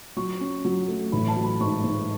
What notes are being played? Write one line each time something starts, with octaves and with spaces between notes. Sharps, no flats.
F#3 C#6
C#4
F#3
A3
A1 B5
A5
F#3
B5
G#2 C#6
G#2